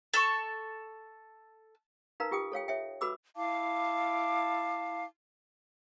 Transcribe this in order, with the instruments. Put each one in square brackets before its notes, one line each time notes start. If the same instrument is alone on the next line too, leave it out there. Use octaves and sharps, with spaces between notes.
[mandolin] A4 A5 C#6
[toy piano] D#4 A#4 B4 F5 A#5
F4 G4 G5 D#6
A4 C#5 F5 G5
C#5 E5 G5
F#4 A4 B4 B5 D6 E6
[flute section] E4 F5 A5 D6